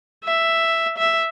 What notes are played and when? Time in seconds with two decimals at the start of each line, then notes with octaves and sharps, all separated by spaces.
0.25 E5
0.98 E5